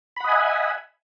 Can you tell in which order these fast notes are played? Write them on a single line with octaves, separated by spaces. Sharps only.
B5 F#5 D#5 G#5 E5